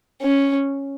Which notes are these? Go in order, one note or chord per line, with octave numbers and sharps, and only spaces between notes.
C#4